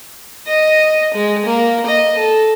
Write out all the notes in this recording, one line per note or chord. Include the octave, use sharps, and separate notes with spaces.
D#5
G#3
A#3
D#5
A4